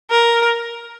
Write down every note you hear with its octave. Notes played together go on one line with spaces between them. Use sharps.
A#4